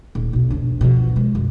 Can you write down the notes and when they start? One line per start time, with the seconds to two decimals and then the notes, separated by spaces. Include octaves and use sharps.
0.15 D#1
0.33 B1 B2
0.50 F2 D4
0.81 B2 F3
1.16 G#3
1.35 F#2